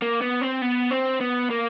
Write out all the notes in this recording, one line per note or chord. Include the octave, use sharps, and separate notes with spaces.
A#3
B3
C4
B3
C4
B3
A#3